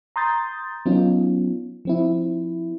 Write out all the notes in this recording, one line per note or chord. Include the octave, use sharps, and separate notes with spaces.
A#5 C6 D#6 G6 A6
F#3 B3 C#4 D#4 F4
F3 C4 E4